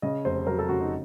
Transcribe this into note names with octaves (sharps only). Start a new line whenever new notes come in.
C#3 D#5
F1 C5
F#3 A#4
A4
C#3 F#4
D#4